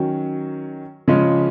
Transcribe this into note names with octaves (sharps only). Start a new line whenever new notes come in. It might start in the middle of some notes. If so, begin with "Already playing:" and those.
Already playing: D#3 F#3 C#4
C#3 F3 G#3 C#4